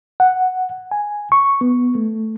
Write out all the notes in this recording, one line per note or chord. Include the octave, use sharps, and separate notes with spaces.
F#5
G#5
C#6
B3
A3